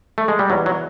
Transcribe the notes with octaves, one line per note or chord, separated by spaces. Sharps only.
A3
G#3
G3
E2 B2 F#3
F#3